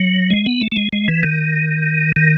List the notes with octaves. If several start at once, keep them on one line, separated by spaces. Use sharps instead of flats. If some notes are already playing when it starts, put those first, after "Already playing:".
Already playing: F#3
G#3
B3
A3
A3
G#3
G#3
E3
D#3
D#3